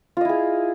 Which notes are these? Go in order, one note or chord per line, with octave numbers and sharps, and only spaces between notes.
E4 F4 G#4 D#5